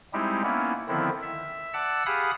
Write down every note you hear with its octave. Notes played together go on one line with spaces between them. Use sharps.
G3 G#3 C4 D#4 E4 G4
A#3 B3 C#4 E4
D3 D#3 F3 B3 C4 E4
E5
D5 F#5 A5 E6
G4 G#4 F5 F#5 B5 D#6